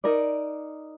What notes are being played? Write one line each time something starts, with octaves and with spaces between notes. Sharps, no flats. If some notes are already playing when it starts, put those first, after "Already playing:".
D#4 A#4 D5